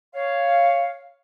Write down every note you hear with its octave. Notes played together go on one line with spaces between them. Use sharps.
C#5 F5